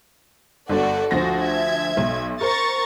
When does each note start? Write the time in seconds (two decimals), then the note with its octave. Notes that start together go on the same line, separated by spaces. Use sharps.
0.69 G1 F#4 A4 D5
1.11 D2 F3 F#4 C5 A#6
1.42 E5 G#6
1.97 B1
2.41 A#4 C5 A#5 C#6 A6